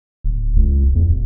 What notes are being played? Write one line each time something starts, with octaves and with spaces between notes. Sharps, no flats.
D1
C#2
E2
D1